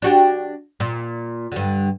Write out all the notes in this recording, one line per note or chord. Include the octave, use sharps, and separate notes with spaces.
D4 F#4 G4
A#2
G2 D3